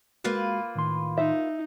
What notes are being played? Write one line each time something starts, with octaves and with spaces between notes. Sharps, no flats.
G#3 A#3 F4 F#4 B4
A2 D#3 C6
D#4 E5